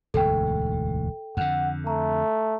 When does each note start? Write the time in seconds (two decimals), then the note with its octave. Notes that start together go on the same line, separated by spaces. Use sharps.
0.14 E1 D2 G#2 A4 G5
1.37 F2 D3 F#5
1.87 A3 A#5